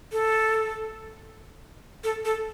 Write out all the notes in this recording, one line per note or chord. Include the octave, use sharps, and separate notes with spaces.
A4
A4
A4